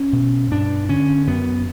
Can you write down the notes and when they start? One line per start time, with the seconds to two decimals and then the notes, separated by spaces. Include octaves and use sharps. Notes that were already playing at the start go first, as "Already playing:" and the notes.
Already playing: C#4
0.13 B2
0.51 G2 D4
0.89 D3 C#4
1.27 F#2 B3